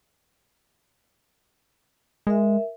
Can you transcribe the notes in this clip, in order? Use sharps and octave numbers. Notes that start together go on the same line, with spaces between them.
G#3 A#4 E5